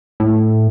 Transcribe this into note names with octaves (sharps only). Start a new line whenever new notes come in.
A2